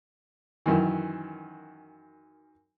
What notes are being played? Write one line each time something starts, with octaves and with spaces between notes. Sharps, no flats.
F#2 D#3 E3